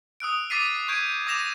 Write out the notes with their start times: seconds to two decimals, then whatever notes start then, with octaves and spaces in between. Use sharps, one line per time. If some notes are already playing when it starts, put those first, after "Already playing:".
0.20 D#6 E6 F#6 D7
0.50 D6 D#6 A6 B6 C7 D#7
0.88 C#6 G6 G#6 D7
1.27 D6 E6 A#6 E7 F7